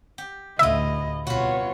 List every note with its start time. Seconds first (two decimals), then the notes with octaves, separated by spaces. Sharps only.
0.18 G4
0.59 D2 A2 E4 F4 D#5 E5
1.27 C2 B2 F4 F#4 B4 C#5